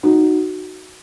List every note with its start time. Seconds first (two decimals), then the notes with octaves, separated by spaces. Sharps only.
0.03 D#4 F#4